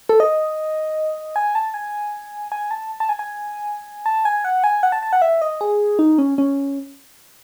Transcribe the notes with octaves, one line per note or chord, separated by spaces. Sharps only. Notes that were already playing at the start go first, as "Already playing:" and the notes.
A4
D#5
G#5
A5
G#5
G#5
A5
A5
G#5
G#5
A5
G#5
F#5
G#5
F#5
A5
A5
F#5
E5
D#5
G#4
D#4
C#4
C#4